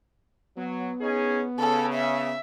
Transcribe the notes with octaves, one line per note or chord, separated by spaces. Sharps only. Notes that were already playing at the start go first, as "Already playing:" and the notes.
F#3 B3
C#4 D#4 G#4
C#3 A4
E5